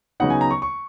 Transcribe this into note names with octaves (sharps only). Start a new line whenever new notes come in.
C#3 F#3 B3 D#4 F#5
G#5
A#5
C#6
C#6